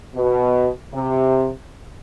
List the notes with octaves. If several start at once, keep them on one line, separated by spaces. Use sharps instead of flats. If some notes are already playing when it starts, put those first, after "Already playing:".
B2
C3